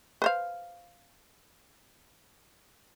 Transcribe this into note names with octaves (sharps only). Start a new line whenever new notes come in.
B4 C5 F5